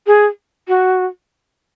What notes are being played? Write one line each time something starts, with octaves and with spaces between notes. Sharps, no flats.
G#4
F#4